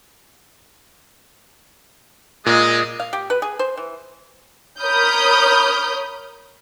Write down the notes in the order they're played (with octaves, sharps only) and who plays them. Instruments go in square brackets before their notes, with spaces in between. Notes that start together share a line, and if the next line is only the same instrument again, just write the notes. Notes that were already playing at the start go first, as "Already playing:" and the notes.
[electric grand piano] A#2 [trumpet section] G#3 [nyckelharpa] D#5
[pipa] F5
G4
B4
G#4
C5
E3
[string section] A#4 C#5 B5 D#6 F6 G6